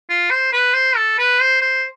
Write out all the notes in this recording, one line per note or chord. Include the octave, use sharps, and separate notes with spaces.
F4
C5
B4
C5
A4
B4
C5
C5